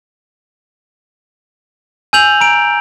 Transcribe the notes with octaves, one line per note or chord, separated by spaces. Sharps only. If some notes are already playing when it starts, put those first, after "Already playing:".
G#5 E6 G6 F7 F#7
A#5 D7